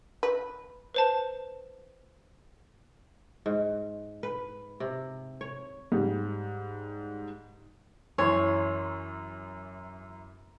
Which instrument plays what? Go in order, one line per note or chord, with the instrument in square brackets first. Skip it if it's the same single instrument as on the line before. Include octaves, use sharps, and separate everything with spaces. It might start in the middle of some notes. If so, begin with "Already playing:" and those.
[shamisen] B4
[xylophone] B4 C5 A5
[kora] G#2
B4
C3
C#5
[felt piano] G#2 G3
[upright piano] F#2 E3 C6 [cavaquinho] C#5